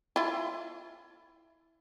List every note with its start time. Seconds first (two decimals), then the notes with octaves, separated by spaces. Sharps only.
0.16 E4 F4